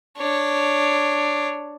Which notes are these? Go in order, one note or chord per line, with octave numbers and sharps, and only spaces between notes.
D4 C#5